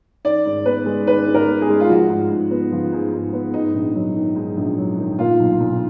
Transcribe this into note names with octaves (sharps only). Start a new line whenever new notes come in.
D#3 D5
G#2
B3 B4
G#3
D#3 B4
G#2
A#4
B3
G#4
G#3
F4
F3 F#4
G#2
G#2
B3
F3
G#2
G#2
B3
G#2 D#4
A#1
F#3
D#3
G#2
A#1
F#3
D#3
A#2 F4
B1
B1